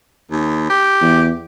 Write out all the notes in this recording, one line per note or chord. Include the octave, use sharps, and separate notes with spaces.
D#2
G4
E2